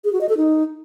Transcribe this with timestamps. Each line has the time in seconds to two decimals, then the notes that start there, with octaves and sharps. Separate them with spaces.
0.05 G#4
0.13 F#4
0.21 D#5
0.29 A4
0.37 D#4